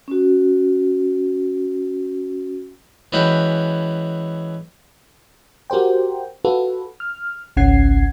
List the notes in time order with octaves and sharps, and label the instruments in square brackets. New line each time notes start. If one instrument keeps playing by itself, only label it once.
[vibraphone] C#4 F#4
[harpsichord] E3 G#3 C#4 F#4 G5 B5
[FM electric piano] F#4 G4 A#4 C5 G5
F4 F#4 A4 B4
F6
G#1 C#2 C#4 F#5 G#6 C7